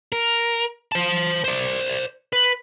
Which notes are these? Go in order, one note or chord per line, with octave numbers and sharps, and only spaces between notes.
A#4
C5 A5
C5 D5
B4